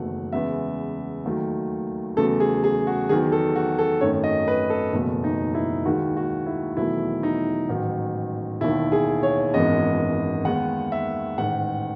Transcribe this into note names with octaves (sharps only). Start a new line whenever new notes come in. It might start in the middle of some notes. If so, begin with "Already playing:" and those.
Already playing: F#1 E2 D#3 F#3 A3 F#5
E2 C#3 G#3 B3 E5
D#2 D#3 F#3 A3
E2 C#3 F#3 A3 A4
G#4
G#4
F#4
E2 D#3 F#3 G#4
A4
F#4
A4
G#1 F#2 D#3 A3 C#5
D#5
B4
A4
F#1 E2 B2 A3
D#4
E4
D#2 D#3 G#3 F#4
F#4
E4
E1 E2 D#3 F#3 A3 E4
D#4
A1 G#2 D#3 F#3
E1 D#2 D#3 E4
G#4
C#5
G#1 F#2 E3 G#3 B3 D#5
D#2 D#3 G#3 B3 F#5
E5
A1 G#2 D#3 F#5